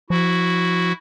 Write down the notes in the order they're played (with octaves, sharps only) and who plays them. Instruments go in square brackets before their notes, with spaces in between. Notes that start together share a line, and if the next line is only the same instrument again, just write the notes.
[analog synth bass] F3 [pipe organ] E4 F#4